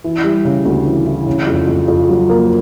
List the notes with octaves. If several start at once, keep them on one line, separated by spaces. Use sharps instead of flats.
E3
G3
C#3
D2
E3
E3
C#3
F2
F2
F2
F#3
A#3